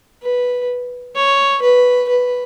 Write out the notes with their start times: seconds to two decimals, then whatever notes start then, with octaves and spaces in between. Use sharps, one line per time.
0.23 B4
1.16 C#5
1.62 B4
2.09 B4